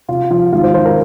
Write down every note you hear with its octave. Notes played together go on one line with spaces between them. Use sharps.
C3 F4
F3 F4
G#1 F4
C5
G#1 C5
A#4